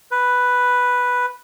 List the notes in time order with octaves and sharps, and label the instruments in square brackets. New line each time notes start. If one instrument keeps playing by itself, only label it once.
[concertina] B4